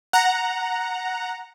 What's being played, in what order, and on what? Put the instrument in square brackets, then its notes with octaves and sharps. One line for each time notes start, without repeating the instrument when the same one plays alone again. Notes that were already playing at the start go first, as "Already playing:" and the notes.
[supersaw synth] F#5 A#5